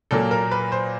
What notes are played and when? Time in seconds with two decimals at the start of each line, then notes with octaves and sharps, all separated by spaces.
0.11 A#2 F#3 A#3 A4
0.31 A#4
0.51 B4
0.72 C5